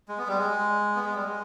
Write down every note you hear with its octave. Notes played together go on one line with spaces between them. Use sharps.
G#3
B3
G3
G#3
B3
G#3
G3
G#3